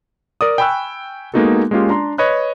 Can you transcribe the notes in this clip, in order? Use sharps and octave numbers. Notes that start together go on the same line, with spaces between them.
A#4 D5 D#6
G5 G#5 B5 C#6 E6 F#6
G#3 A#3 B3 D#4 F#4 A4
G#3 A#3 C#4 F4 G4
D4 A#5 C6
B4 C#5 D#5 B5 F#6